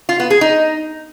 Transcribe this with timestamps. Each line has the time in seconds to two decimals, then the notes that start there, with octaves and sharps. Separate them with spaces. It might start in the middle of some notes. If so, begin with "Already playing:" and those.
0.09 F4
0.20 B3
0.30 G#4
0.41 D#4